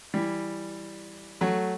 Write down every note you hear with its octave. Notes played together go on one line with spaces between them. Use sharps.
E3 G3
F#3 A3